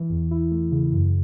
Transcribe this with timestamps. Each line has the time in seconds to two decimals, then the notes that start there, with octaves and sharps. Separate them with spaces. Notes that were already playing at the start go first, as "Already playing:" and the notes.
Already playing: E3
0.10 E2
0.31 E4
0.51 A3
0.72 C#3
0.92 F#2